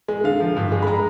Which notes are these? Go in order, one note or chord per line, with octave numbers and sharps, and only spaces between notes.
G#3
D3 F5
F3
G2
G#3
B5
G#3 A#5